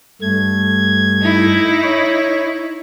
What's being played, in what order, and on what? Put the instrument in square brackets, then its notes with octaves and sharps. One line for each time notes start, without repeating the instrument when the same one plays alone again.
[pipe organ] G2 A3 G#6
[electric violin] D#4 E4
[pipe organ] C#5